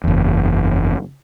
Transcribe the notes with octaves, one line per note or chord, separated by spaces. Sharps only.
F#1 E2